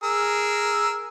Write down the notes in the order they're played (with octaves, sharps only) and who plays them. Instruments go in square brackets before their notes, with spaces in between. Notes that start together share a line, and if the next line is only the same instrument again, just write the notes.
[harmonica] G#4 A#4 E6